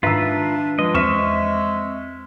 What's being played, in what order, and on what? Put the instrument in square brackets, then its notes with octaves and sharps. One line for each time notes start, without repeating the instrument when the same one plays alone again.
[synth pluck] G#2 D#3 [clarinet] D4 [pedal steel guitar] F4 B4 [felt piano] E5 A#5 E6
[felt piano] F3 B4 [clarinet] G#3 [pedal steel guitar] D#5
[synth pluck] E2 [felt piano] C4 F6 E7 [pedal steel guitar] E5 C#6